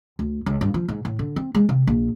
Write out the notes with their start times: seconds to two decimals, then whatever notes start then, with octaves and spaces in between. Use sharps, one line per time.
0.19 D2
0.46 C#2
0.61 G2
0.74 F3
0.88 G#2
1.05 A2
1.19 D3
1.36 C4
1.55 G#3
1.69 C3
1.87 A#1